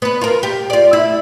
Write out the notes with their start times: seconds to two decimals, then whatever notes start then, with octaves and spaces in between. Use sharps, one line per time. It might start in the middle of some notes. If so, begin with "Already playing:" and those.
0.02 B3 B4
0.21 F4 A#4
0.43 G4
0.70 F4 D5
0.93 E4